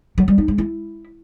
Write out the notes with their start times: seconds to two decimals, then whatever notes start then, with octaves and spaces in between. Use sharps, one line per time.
0.18 F#3
0.28 G3
0.38 D#4
0.48 G#3
0.58 E4